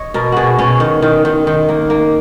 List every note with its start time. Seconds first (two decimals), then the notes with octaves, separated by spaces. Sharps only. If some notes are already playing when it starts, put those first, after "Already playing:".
Already playing: C#5 D#5
0.14 B2 A#4
0.32 B2 F#4 G#4
0.59 B2 C#4
0.80 D#3
1.02 D#3
1.25 D#3
1.47 D#3
1.69 A#3
1.90 A#3